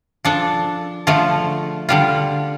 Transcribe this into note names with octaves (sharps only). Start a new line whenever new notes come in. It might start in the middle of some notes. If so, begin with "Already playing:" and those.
F3 D4 A4
D3 F3 A3 F4
D3 G3 F4